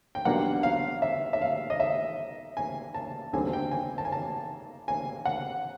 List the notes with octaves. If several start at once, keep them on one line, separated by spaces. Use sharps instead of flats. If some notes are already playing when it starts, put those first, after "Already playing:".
G5
B1 B2 G3 A#3 D4 F#5
F5
E5
E5
F5
D#5
E5
G#5
A5
D2 D3 G3 C4 G#5
G5
G#5
A5
G#5
A5
G#5
F#5